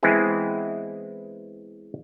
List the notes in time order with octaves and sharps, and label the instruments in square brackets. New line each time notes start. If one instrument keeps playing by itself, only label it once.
[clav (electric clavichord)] E3 G#3 B3 C4 E4 G#4